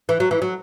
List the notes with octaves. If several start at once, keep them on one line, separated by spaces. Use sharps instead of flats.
E3
F#3
E3
F#3